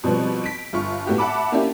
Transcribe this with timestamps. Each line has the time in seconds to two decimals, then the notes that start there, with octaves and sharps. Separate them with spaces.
0.04 B2 F3 G3 B3 C4
0.44 B6 D7
0.73 G1 F4 C#6
1.07 A2 B3 F#4 G4
1.18 E5 F#5 A5 B5 D6
1.52 A#3 C#4 D4 E4 G4